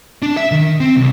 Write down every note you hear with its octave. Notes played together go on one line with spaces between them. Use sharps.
D4
E5
D#3
C4
C2